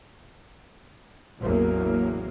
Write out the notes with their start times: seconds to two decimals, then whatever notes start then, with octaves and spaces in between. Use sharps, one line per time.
1.39 A1 E2 F#3 A#3